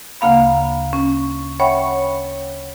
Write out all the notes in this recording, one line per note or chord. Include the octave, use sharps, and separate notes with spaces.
D2 C#3 A#3 F5 B5
C#4
C#5 E5 F#5 G5 B5 C#6